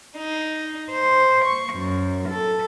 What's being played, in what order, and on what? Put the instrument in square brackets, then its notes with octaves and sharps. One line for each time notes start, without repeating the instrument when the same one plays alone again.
[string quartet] D#4
C5
C#6
F#2
A4